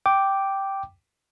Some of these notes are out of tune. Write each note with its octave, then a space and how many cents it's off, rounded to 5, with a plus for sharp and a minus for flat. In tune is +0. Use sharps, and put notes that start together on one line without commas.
G5 -5 D6 +0